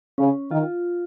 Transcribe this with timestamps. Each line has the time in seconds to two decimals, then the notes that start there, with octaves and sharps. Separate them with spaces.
0.18 C#3 C#4
0.51 D#3 F4